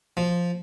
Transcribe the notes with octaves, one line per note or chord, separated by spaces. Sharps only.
F3